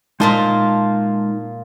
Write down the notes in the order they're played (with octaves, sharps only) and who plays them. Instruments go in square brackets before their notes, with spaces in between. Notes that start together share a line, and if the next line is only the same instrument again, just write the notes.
[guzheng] A#2 A#3 F4 [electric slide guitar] G#3 D#4 A5